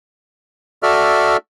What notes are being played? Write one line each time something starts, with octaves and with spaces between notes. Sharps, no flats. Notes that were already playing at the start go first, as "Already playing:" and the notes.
F#4 A4 D5 E5 F6